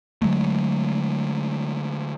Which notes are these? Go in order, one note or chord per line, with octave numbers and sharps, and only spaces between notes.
D3 F#3 G#3 A3